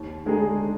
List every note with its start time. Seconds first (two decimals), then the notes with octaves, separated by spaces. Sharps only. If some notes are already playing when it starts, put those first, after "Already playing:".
Already playing: D#2
0.26 D3 G#3 D#4 G#4